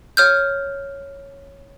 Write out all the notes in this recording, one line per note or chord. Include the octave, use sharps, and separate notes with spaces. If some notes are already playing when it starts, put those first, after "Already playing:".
C#5 F6 G6